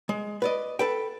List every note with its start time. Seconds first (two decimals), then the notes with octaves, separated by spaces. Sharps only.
0.09 G#3
0.42 B4 D5 D#5
0.79 A4 B4 G5